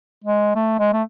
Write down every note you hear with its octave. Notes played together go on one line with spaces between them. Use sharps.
G#3
A3
G#3
A3